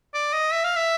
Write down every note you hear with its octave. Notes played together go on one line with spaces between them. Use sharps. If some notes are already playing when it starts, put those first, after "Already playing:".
D5
D#5
E5
F5
E5